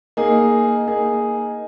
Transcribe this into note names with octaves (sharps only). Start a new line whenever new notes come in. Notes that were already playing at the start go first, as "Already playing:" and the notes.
A#3 D#4 G#4
A#3 D#4 G#4